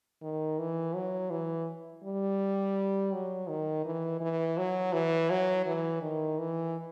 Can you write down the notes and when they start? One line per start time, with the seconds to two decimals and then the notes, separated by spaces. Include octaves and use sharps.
0.22 D#3
0.59 E3
0.95 F#3
1.30 E3
2.04 G3
3.12 F#3
3.48 D#3
3.85 E3
4.20 E3
4.58 F#3
4.93 E3
5.30 F#3
5.66 E3
6.01 D#3
6.38 E3